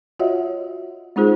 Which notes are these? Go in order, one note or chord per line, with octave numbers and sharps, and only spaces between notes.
F4 F#4 C#5 D#5 E5 F#5
G#3 C4 D#4 F4 G#4 C5